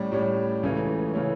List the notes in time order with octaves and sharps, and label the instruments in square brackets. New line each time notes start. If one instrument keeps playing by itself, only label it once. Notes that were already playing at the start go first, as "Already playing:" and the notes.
Already playing: [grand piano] A2 G3 C#4
A2 G3 C#4
C#2 C#3 E3 A3 C#4
C#3 E3 A3 C#4